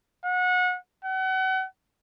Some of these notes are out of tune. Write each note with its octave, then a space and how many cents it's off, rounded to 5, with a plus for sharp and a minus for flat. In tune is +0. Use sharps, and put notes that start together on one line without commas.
F#5 -30
F#5 +35